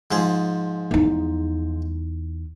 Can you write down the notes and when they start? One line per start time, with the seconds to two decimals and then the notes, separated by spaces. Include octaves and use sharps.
0.11 G#2 F3 G#4
0.91 E2 D#4